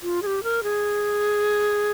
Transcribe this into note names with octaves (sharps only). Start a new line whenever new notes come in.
F4
G#4
G4
A#4
G#4